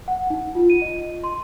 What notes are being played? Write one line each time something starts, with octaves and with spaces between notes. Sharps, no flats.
F#5
D#4
F4
D#7
D#5
C6